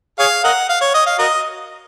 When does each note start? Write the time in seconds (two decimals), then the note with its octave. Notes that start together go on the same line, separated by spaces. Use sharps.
0.19 G#4 C#5 F5
0.44 A#4 D#5 F#5
0.69 F5
0.81 C#5
0.94 D#5
1.06 F5
1.19 F#4 A#4 D#5